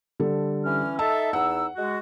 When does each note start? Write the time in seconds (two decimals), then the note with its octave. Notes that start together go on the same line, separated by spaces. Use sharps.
0.20 D3 G3 A4
0.64 E3 C#4 F6
0.99 D#4 A4 E5 A5
1.33 E2 D#4 F#5 E6
1.76 G#3 F#4